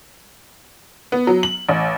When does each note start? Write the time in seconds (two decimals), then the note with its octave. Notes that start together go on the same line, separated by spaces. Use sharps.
1.12 B3
1.27 F#3
1.43 F#7
1.69 A1